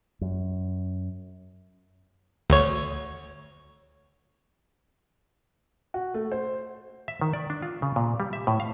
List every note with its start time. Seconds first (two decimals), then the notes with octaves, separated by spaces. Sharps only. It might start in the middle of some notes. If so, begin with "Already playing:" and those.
0.21 F#2
2.50 D2 C#5
5.94 F#4
6.14 A3
6.32 C5
7.08 E5
7.21 D#3
7.33 D5
7.50 D4
7.62 F4
7.82 C#3
7.96 A#2
8.20 G3
8.33 E5
8.47 A2
8.60 F5